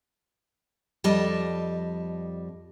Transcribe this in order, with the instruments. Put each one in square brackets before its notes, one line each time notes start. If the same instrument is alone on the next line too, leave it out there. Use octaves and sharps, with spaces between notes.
[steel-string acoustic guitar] F2 G3 D#5 A5